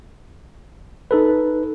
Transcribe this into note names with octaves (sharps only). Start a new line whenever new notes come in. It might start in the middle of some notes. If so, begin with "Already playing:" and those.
D#4 A4 B4